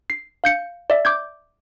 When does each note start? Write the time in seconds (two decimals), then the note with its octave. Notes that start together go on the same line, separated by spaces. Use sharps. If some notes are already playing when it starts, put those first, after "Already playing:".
0.10 C7
0.44 F5 G6 C#7
0.90 D5 E5
1.05 D6 G6 G#6